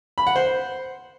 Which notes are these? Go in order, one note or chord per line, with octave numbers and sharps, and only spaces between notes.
B5
F#5
C5